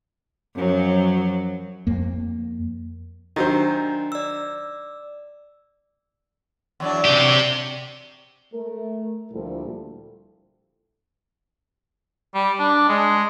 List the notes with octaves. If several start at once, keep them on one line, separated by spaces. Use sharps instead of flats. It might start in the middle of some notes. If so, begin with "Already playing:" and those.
F#2 F3 F#3
F2 A#3
D#3 F#3 D4 C5 D#5
D5 E6
E2 F#3 D4
C3 G4
A3 A#4
D2 A#2 F3 G3 E4 A4
G3
D4
G#3